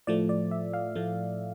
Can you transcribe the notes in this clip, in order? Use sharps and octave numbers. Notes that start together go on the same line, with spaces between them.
A2 F3 A3 D5
D5
E5
F5
A2 F3 A3